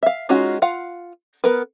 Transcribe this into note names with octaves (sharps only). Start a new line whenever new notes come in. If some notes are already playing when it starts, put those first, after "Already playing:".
E5 F5
G#3 C#4 D#4 F4 F#4
F4 F5 F#5
B3 A#4 B4